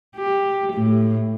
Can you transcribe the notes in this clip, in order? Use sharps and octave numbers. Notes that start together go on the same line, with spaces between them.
G4
A2